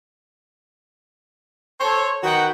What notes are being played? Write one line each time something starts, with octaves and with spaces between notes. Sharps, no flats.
A4 C5 C#5
D#3 F#4 B4 F#5 G5